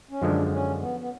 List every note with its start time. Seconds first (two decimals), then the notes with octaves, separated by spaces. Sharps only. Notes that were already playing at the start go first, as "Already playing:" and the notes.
0.11 C#4
0.22 F#2 D3 F3 G#3 D4
0.52 C#4
0.81 B3
1.00 B3